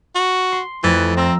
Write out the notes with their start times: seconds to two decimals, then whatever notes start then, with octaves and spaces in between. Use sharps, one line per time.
0.15 F#4
0.52 C6
0.84 F2 E3 A3 A6
1.17 C4 A#5 E6